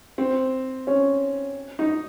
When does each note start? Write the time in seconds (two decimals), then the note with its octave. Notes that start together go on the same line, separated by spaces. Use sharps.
0.18 C4
0.87 C#4
1.79 D#4